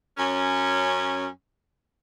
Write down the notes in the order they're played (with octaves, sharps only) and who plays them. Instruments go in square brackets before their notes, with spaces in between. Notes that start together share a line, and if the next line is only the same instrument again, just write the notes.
[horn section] F#2 C#4